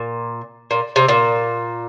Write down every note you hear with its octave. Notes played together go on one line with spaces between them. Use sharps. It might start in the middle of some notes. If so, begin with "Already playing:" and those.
Already playing: A#2
A#2
C3
A#2